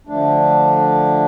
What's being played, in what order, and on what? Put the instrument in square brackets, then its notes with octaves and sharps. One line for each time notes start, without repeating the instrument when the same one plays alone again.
[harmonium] D3 F3 A3 D4